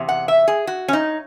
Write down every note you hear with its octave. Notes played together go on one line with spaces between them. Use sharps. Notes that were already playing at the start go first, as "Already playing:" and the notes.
Already playing: E2 C3
F#5
E5
G#4
F#4
C#4
D#4